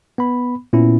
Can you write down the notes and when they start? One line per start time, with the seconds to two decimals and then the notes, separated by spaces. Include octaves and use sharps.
0.18 B3 B5
0.73 A#2 B3 C#4 E4